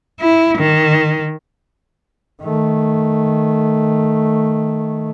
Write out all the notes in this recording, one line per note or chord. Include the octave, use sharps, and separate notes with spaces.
E4
D#3
D#3 A3